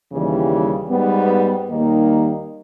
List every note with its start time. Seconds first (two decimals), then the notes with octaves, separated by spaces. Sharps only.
0.11 D#2 C#3 E3 G3
0.90 G#2 G3 B3
1.69 D#2 D#3 G3 A#3 D#4